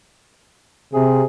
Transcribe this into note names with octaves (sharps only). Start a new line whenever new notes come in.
C3 G#4